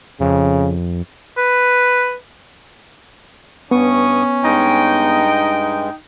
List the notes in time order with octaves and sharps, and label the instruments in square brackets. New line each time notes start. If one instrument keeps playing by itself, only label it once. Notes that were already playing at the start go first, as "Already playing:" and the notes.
[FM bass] F2 [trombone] C#3
[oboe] B4
[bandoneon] G2 C#6 D#6 [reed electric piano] B3 [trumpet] C#4
[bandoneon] G2 G#3 [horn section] D#4 G5